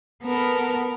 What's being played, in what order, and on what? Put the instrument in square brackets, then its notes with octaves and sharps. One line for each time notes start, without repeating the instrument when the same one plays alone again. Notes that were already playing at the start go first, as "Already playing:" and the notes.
[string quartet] B3 A4 A#4